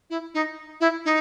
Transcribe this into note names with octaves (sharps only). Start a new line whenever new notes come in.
E4
D#4
E4
D#4